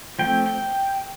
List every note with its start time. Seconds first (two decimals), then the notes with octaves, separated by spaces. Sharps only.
0.19 F3 A3 C4 G5
0.46 G5